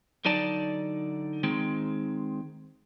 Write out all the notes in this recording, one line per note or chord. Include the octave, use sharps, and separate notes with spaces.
D3 F#3 D#4 D5 A5
D#3 G#3 C4